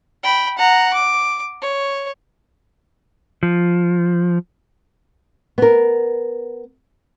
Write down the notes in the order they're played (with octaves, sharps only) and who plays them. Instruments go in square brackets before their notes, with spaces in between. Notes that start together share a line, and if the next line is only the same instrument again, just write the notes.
[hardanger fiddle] G5 B5
F#5 A#5
D6
C#5
[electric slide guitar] F3
[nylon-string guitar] B3 A#4